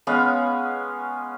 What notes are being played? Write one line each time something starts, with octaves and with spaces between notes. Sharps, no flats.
G#3 B3 C#4 F5